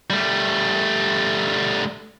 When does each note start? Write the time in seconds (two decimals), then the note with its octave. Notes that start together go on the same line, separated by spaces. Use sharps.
0.10 G3 A3